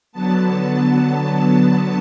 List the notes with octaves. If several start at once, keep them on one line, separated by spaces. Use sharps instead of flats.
D3 F#3 B3 A5